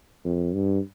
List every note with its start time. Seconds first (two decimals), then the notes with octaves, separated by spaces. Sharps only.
0.25 F2
0.54 G2